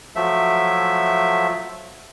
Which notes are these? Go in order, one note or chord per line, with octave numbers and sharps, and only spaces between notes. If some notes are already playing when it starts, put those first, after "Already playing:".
F3 F#3 A3 E5